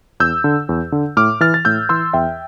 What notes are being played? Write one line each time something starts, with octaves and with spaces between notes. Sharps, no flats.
E2 E6 G6
D3
E2
D3
A2 D6 F6
E3 F6 A6
A6
A2 E6 G6
E3 C6 E6
E2 E5 G5